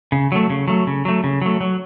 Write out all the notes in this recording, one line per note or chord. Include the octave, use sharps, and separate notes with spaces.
C#3
F#3 A3
C#3
F#3 A3
C#3
F#3 A3
C#3
F#3 A3
F#3